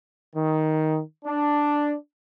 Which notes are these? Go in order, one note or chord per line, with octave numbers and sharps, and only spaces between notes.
D#3
D4